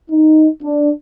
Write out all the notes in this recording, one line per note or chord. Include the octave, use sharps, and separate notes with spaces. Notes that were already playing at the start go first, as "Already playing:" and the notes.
D#4
D4